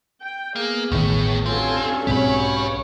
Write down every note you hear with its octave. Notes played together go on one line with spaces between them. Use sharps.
G5
A#3 B3 G#4
E1 A1 A2 D#3
G2 F#3 C4 C#4 F4 A4 G#5
B1 G#2 G#3 C4 G4 C#5 B5